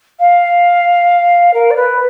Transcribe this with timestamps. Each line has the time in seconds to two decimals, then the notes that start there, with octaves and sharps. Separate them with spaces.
0.19 F5
1.54 A#4
1.71 D5
1.76 B4